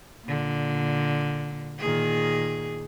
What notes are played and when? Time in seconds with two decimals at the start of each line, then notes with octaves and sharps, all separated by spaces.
0.25 A#2 D3
1.79 A#2 D#3 G#4